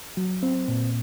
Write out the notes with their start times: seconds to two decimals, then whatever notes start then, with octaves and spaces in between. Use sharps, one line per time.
0.17 F#3
0.43 C4
0.68 A#2